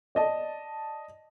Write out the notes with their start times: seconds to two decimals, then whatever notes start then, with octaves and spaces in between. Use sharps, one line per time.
0.15 D5 D#5 A5